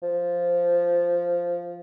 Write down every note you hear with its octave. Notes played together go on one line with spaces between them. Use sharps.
F3